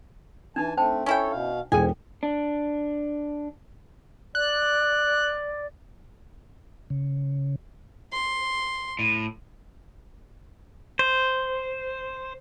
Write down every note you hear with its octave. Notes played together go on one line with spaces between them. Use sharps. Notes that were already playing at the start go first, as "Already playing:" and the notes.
E3 D4 D#4 G#5 A5
A3 C4 C5 G5 A5
C#4 E4 A4 C#5 G5 G#5
B2 F5
E1 G#2 G#4 A4 G5 G#5 D#7
D4
D5 F#6
C#3
C6
A2
C5